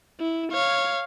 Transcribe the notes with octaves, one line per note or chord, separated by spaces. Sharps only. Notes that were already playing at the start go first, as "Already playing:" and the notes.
E4
C#5 F5